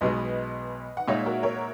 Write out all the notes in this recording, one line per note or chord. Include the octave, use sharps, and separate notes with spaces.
B1 B2 G#3 B4 D#5
F#5
A#2 G#3 D#4 C#5 E5
F#4 A#4
A#4 C#5